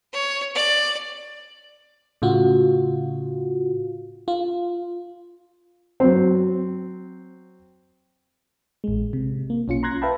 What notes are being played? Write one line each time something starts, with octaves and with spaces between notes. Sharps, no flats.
C#5
D5
A2 C#3 F4 F#4
F4
F#3 C4
A1 G#3
C3
A#3
B1 C#4 F4 C#7
A#5 C6 F#6 G#6 A#6
B4 E5 F5 G5 A5 B5